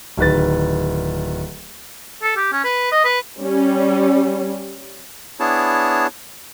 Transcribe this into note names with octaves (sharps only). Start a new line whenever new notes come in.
D1 D#3 B4 A6
A4
G4
C#4
B4
D#5
B4
G3 C#4
B3 D4 E4 G#4 C#5 A5